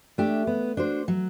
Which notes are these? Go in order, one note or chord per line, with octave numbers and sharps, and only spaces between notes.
A3 D4 G4
B3
D4 F#4 C5
F#3